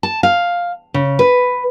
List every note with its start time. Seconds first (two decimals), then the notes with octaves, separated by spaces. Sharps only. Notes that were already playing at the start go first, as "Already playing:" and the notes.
0.03 A5
0.23 F5
0.94 C#3
1.19 B4